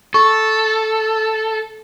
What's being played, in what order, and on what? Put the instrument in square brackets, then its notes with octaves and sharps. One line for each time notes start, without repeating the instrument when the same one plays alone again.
[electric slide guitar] A4 [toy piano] C#6